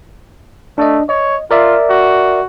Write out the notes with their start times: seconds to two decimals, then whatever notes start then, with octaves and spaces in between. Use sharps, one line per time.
0.78 A3 D4 D#5
1.09 C#5 D#5
1.51 F4 A#4 D5 E5
1.90 F#4